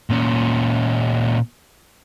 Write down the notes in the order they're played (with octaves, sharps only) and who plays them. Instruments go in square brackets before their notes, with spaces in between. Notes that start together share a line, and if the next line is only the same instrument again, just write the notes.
[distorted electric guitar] A#2 C#4